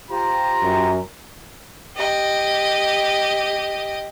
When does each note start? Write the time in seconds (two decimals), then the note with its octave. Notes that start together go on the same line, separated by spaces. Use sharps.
0.11 F4 G4 C5 A#5
0.62 F#2
1.96 G4 D#5